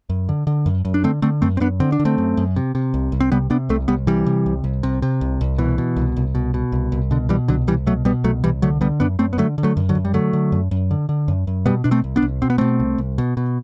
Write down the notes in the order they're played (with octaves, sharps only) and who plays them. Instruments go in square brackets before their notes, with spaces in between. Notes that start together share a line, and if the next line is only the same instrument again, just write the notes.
[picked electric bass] F#2
D3
D3
F#2
F#2
D4
D3 A3 C4
D3 A3 C4
F#2 A3 C4
C4
F#2 B3 D4
D3 C4
D4
D3
A3 C4
F#2
F#2
C3
C3
C2
C2
C4
C3 G3 B3
C3 B3 D4
C2 A3 C4
C2 G3 B3
C3 E3 G3
C3
C2
C2
C3
C3
C2
C2
B2 E3
B2
C2
C2
B2
B2
C2
C2
B2 D3
B2 E3 G3
C2 D3 F#3
C2 E3 G3
B2 F#3 A3
B2 G3 B3
C2 F#3 A3
C2 E3 G3
D3 F#3 A3
D3 G3 B3
F#2 B3 D4
F#2 A3 C4
B3
D3 F#3 A3
D3
F#3 A3
F#2
D3 F#3
F#2
G3
D3 F#3 A3
D3
F#2
F#2
D3
D3
F#2
F#2
B2 G3 B3
B2 D4
A3 C4
C2
B3 D4
C2
B2 C4
B3
B2 A3 C4
C2
C2
B2
B2